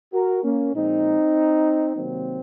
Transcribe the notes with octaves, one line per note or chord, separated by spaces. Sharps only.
F#4 A#4
A#3 C#4
A#2 F3 G#3 C4 D#4
C3 D#3 F#3 A#3 C4